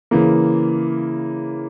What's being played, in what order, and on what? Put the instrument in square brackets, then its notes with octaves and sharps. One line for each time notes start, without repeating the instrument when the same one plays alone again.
[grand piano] C#3 E3 A#3